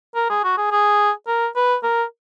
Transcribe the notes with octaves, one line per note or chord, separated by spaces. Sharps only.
A#4
G#4
F#4
G#4
G#4
A#4
B4
A#4